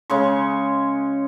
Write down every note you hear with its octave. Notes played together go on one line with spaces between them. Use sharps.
C#3 G#3 C#6